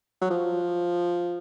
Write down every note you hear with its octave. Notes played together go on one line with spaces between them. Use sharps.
F#3
F3